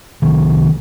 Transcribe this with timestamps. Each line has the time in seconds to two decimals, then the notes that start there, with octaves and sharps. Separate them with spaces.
0.22 C2 C3 D#3